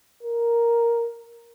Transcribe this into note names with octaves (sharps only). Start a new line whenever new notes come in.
A#4